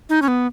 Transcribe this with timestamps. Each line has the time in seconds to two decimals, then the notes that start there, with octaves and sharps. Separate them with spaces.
0.10 D#4
0.22 C#4
0.28 B3